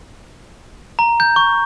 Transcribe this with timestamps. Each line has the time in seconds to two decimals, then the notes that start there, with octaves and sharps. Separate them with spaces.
0.99 A#5
1.20 G6
1.36 C#6